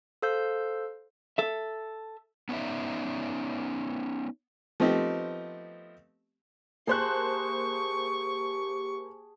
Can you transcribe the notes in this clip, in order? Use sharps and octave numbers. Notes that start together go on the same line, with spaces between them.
A4 C5 F5 E6 G6
A4 E5
B3 C#4 D#4 D5 E5
F3 A3 B3 C4 D#4 G4
A#3 G4 G#4 C5 G5 A5 C#6 F#6